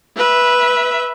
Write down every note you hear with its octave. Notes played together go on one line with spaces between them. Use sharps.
B4 E5